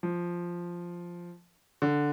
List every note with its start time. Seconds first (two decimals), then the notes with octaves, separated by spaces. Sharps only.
0.03 F3
1.82 D3